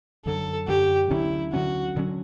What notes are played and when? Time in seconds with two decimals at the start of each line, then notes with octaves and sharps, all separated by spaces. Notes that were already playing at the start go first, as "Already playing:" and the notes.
0.25 F#2 D3 F#3 A4
0.68 F#2 D3 F#3 G4
1.10 D2 D3 F#3 C#4 E4
1.53 D2 D3 F#3 C#4 F#4
1.95 D2 D3 F#3 C#4